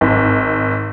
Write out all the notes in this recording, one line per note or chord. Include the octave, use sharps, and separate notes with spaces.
G#1